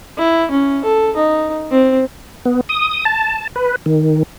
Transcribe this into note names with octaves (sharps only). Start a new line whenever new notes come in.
E4
C#4
A4
D#4
C4
B3
D#6
A5
B4
D#3